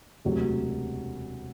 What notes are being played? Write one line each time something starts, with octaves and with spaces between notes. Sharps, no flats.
E1 D2 C3 F#3